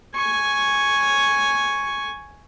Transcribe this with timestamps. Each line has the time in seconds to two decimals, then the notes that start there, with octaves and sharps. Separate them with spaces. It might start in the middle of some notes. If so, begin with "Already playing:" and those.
0.16 G#5 C#6